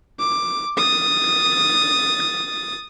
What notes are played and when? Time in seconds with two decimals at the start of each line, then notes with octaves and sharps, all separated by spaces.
0.19 D6
0.77 D#6 A6